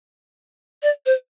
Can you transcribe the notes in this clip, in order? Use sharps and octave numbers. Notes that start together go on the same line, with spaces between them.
D5
C5